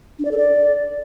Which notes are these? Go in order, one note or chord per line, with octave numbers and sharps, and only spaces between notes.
D4
D5
A4
D5